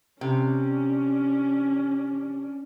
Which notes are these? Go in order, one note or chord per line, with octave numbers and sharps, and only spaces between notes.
C3 C#4 D4